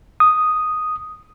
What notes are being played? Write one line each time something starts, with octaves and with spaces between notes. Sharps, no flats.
D#6